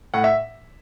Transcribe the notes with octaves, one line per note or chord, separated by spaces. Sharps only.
A2 F#5
E5